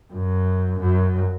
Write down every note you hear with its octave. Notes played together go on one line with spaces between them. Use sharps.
F#2
F#2